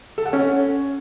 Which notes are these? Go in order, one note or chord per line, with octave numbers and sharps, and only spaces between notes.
A4
F#5
C#4